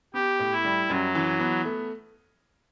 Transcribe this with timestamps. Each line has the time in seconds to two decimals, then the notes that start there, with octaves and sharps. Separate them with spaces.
0.14 B3 G4
0.39 A2
0.52 E4
0.65 G3
0.90 F#2 F#3
1.15 E3
1.40 B3
1.65 A3